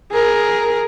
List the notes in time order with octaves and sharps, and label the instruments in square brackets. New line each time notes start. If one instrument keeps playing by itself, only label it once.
[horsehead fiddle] G#4 A#4